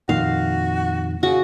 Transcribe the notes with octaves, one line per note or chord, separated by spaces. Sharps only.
F2 A#2 D#3 F#4 F5
C#3 F#4